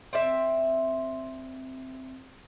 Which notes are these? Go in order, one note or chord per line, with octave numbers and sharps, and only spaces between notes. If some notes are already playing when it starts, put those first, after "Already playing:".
C4 D5 E5